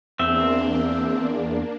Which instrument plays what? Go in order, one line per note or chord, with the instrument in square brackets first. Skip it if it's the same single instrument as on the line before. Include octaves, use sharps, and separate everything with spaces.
[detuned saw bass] E2 [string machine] A#3 D4 [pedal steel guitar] C4 E5